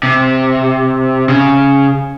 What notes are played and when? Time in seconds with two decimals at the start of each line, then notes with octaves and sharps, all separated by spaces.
0.03 C3
1.29 C#3